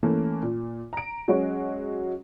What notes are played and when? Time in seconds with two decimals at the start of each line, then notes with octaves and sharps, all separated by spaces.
0.03 E3 A3 A#3 C#4
0.43 A#2
0.93 A#5 D7
1.28 F#3 G#3 C#4 F#4 C#5